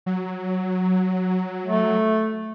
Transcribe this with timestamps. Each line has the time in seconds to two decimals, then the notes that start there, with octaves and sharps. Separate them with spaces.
0.06 F#3
1.66 A3